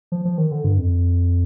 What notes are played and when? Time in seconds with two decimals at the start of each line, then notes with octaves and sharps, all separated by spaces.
0.12 F3
0.25 F3
0.38 D#3
0.52 D3
0.64 G2
0.78 F2